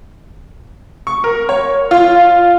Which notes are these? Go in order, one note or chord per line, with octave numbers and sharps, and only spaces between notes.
C#6
A#4
C#5
F4